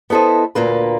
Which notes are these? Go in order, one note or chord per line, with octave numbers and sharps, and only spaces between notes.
B3 E4 A4 C5 D#5
D2 A#2 A#3 B4